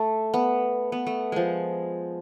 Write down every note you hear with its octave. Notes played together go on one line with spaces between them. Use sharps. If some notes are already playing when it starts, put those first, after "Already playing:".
Already playing: A3
B3
B3
A3
F3 G#3